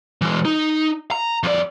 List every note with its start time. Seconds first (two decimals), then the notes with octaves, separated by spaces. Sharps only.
0.21 E3 G#3
0.45 D#4
1.11 A#5
1.43 F2 D5